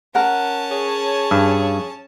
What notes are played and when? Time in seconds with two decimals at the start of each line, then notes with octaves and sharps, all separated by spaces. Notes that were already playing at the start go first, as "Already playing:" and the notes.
0.15 C#4 A#4 F#5 A5
0.72 G#4 C#5
1.31 G2